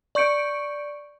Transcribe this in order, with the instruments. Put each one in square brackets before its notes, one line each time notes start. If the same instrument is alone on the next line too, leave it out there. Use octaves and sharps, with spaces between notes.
[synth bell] D5 C#6 G6 C#7 D7